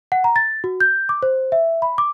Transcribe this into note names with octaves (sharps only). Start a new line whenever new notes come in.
F#5
A#5
A6
F#4
G6
D6
C5
E5
B5
D6